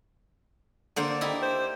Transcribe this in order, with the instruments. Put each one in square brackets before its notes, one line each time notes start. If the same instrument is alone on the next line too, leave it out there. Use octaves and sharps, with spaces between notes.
[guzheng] D3 A#3 C5
D#4 E4 G4
[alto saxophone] C5